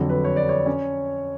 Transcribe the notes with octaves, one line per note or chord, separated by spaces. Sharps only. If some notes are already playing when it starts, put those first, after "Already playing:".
Already playing: F2 D3 F#3 F#4
B4
C#5
D5
C#5
C#4